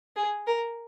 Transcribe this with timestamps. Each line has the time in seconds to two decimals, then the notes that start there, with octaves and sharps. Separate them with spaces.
0.16 G#4
0.47 A#4